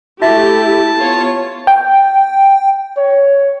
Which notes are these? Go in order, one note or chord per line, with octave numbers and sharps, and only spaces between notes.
A3 E4 F#4 G4 E5 A5
B3 F4 C#5
G5
C#5